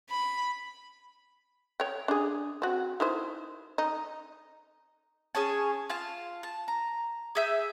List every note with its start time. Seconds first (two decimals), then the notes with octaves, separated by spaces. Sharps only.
0.10 B5
1.80 C#5 G5
2.08 D4 G#4
2.62 C4 F#4
3.00 D#3 E4 C5
3.78 D#4
5.35 C#4 G#4 C#5 A5
5.90 F4 F5 A5
6.43 A5
6.68 A#5
7.35 G#4 E5 G6